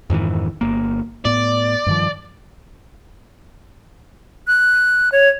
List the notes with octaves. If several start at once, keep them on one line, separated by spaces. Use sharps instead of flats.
F2 G#2 D#3 E3
G1 A#3
A2 B3 D5
G2 D#3 F3
F#6
C#5